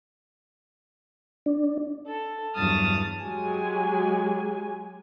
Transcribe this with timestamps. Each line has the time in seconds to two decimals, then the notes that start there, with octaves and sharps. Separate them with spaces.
1.46 D4
2.06 A4
2.55 E2 G2 F#3 A5 D#6 F6
3.21 F#3 G#3 G4 G#5